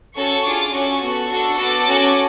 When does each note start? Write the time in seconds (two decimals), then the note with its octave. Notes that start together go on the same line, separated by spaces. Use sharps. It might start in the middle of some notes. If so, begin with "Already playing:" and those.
0.16 C#4 F#4 A4 C#6
0.44 D4 F4 G#4 D6
0.73 C#4 F#4 A4 C#6
1.01 B3 F#4 A4
1.29 D4 F#4 A4 C#6
1.58 B3 F#4 A4 D6
1.86 C#4 F#4 A4